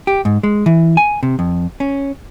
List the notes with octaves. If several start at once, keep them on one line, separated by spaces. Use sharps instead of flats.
G4
G#2
G#3
E3
G#5
C3
F2
C#4